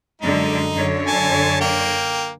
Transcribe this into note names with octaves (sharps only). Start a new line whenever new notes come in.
F#2 D3 G#3 D#4
F#2 D3 C#5
G#5 A5
A#3 G5